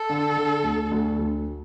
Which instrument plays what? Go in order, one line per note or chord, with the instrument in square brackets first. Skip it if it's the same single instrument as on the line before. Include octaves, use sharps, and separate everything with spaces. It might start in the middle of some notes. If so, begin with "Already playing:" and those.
Already playing: [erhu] A4
[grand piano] D3
D3
D2
D2
D2